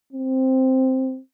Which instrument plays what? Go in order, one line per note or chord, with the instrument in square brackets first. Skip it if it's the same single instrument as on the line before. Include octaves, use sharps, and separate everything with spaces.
[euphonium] C4